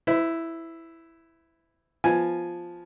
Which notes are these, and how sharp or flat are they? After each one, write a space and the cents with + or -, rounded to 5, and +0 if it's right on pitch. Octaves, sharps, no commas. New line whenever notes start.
E4 +0 C5 -45
F3 +0 B3 +0 G#5 +0